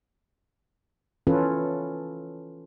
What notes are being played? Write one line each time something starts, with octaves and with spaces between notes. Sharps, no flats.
E3 C#4 F4 A4 B4